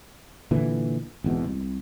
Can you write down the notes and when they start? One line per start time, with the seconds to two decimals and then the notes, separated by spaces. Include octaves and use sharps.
0.51 A#2 D3 E3
1.24 G#1 E2 B2
1.45 C2